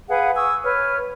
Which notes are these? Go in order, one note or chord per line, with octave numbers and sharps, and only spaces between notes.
G#4 B4 F5 F#5
G#5 C#6 D#6 E6
B4 C#5 F6